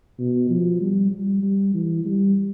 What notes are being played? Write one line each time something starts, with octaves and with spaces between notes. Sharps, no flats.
B2
F3
G3
G3
G3
E3
G3